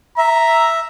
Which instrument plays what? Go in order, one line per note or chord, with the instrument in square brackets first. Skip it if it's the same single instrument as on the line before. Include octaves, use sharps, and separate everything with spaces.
[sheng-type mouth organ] E5 [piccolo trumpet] A#5